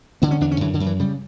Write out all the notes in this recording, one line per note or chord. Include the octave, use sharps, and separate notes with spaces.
D3 B3
C#4
E2 D4
C#4
F#2 E3
D3
F#2
E3
C#3 G3